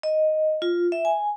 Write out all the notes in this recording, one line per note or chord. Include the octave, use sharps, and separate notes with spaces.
D#5
F4
E5
G#5